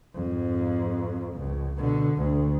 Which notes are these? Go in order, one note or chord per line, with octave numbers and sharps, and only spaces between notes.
F2 G#2
C#2
B2 D3
D2